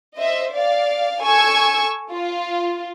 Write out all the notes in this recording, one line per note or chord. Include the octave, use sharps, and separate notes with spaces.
C5 D#5 E5
D5 F5
A4 G#5 C#6 E6 G#6
F4